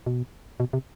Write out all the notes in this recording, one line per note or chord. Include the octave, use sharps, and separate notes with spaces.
B2
B2
C3